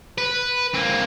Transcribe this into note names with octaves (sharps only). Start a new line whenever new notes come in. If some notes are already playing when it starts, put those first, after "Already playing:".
B4
A#3 C4